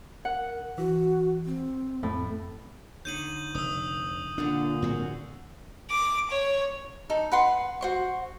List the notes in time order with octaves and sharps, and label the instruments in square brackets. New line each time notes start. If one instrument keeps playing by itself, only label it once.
[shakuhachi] A#4 [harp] F#5
[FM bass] E3 [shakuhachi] F#4
[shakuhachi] C4
[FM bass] F2 [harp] A2
[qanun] D3 D#4 C#5 [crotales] G6 D#7 F#7
[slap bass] F1 [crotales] D#6 E6
[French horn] A#2 [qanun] D3 D5 F#5 [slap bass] D4
[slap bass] A2 F3 C4 [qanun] F#4 G#4
[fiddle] D6
C#5
[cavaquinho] D#4 A4
B4 F#5 C6
F#4 C5 C#6